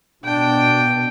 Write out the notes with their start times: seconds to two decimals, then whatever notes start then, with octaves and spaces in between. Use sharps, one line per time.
0.24 B2 D4 G5